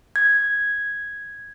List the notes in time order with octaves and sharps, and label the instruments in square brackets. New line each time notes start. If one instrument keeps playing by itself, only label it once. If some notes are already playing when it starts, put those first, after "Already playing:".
[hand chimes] G#6